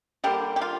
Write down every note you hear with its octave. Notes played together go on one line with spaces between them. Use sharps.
D3 G3 A#3 G4
G4
F4